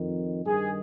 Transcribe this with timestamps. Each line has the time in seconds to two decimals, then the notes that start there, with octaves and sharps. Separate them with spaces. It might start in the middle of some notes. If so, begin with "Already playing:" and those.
Already playing: F2 D#3
0.45 G2 D#3 G#4